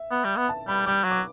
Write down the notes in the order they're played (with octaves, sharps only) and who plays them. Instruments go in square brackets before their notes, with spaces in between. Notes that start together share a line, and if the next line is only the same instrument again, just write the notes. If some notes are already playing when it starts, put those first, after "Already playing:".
Already playing: [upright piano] E5
[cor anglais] B3
G3
B3
[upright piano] A5
[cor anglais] G3 [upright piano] B5
[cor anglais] G3 [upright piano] D6
[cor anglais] F#3
[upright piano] D6